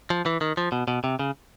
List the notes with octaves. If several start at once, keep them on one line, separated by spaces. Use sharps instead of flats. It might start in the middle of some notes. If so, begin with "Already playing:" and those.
F3
E3
D#3
F3
B2
B2
C3
C#3